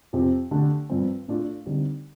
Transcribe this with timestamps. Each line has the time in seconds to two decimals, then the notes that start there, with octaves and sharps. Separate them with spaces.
0.13 F2 C3 F3 C4 G4
0.51 D3 A3 D4 G4
0.90 G2 F3 C4
1.28 A2 A3 D4 F4
1.66 D3 G3 C4 D#4